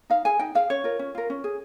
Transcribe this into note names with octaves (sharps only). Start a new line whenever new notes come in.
D#4 F5
G#4 G#5
D#4 G5
G#4 F5
C#4 C#5
F4 A#4
C#4
F4 A#4
C#4
G#4